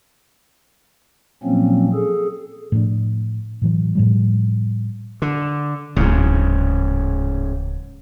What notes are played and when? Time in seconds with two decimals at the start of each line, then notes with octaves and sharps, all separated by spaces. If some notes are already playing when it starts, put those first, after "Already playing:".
1.43 A#2 F3 F#3 A#3 C4 C#4
1.93 G#4 A4
2.72 A2 F3 D4
3.62 A2 E3 F#3
3.95 A2 F3 G3
5.22 D3
5.96 D1 G#2 C#3